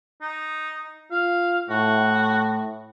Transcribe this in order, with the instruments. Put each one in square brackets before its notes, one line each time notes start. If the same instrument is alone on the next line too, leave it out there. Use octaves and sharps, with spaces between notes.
[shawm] D#4
[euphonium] F4 [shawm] F5
[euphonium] A2 [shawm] F#4